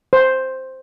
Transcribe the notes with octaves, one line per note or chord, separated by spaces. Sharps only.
C5